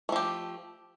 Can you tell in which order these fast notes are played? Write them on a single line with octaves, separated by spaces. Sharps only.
A3 F3 G4